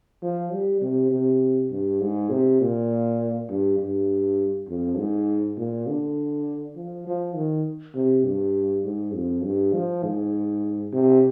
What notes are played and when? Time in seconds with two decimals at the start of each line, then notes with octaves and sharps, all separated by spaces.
0.23 F3
0.53 G3
0.82 C3
1.12 C3
1.71 G2
2.01 G#2
2.30 C3
2.61 A#2
3.49 G2
3.79 G2
4.69 F2
4.98 G#2
5.58 A#2
5.88 D3
6.76 F3
7.07 F3
7.36 D#3
7.95 C3
8.25 G2
8.85 G#2
9.15 F2
9.44 G2
9.74 F3
10.04 G#2
10.93 C3